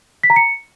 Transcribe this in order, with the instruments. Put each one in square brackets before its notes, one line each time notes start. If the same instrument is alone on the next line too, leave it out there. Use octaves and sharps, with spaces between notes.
[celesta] B6
A#5
C#7